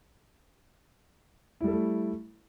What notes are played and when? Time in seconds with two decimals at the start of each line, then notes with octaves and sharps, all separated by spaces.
1.61 E4
1.64 G3
1.68 A4
1.71 A3